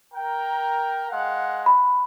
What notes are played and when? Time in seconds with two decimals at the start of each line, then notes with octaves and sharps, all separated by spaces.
0.14 A#4 G5
1.10 G#3 F5 F#5
1.66 B5